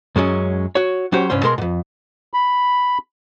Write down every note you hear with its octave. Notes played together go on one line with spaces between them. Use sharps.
F#2 F#3 G#3 C#4
F#4 C#5
F#3 C#4 F#4 G4 C5
C2 G2 C#4 C5
B2 G#3 A#4 C6
F2 G#2
B5